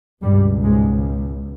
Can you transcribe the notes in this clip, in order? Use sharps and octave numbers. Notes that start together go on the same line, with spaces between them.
C#2 G2 B2 G3
G#2 G#3